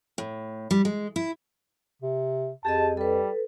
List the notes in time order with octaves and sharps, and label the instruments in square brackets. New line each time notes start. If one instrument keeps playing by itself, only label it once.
[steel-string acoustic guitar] A2
G3
G#3
E4
[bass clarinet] C3
[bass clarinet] F2 [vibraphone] G4 G#4 D#5 [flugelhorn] A5
[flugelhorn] G3 [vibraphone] A4 B4